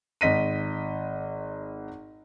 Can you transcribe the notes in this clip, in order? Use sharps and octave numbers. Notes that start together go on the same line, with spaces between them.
G#1 D#5 B6 D#7